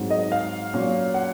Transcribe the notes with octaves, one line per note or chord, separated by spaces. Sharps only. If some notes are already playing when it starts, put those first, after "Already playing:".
Already playing: G#2 F#3 C4
D#5
F5
A#2 F#3 C#4
F#5